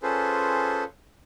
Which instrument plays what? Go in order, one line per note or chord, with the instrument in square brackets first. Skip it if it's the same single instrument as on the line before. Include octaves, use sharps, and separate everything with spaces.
[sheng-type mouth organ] C#4 F4 G#4 A4 B4 C5